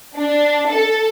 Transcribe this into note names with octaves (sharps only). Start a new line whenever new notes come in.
D4
A4